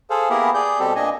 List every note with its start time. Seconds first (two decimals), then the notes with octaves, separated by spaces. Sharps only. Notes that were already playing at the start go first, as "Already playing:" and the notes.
0.10 G#4 A4 C5 F5
0.30 A#3 B3 E4 G4 G#4 A#4
0.54 G#4 D5 G6
0.79 B2 G3 C4 G4 A4
0.96 A#2 D4 D#5 G#5